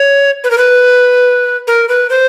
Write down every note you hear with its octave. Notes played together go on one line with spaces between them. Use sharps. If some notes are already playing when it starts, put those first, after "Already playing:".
Already playing: C#5
B4
A#4
B4
A#4
B4
C5